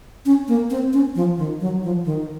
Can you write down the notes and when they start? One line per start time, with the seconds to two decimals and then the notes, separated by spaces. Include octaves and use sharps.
0.25 C#4
0.48 A#3
0.70 C4
0.93 C#4
1.15 F3
1.38 D#3
1.61 F#3
1.83 F3
2.05 D#3